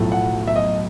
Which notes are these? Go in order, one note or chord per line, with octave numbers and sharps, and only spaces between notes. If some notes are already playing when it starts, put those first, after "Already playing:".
Already playing: B1 A2 F3 A3
F#5
E5
D#5